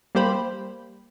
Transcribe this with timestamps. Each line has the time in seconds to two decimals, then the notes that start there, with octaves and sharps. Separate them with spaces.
0.15 G3 A#3 G4 C5 B5